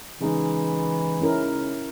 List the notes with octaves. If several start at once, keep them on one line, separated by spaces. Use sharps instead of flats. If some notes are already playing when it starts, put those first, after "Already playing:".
C#3 E3 G#3 D#4
C#4 E4 A#4